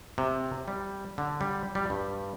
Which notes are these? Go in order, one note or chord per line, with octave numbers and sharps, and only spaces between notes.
C3
G3
D3
G3
G3
G2